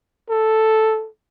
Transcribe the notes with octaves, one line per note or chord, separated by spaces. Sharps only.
A4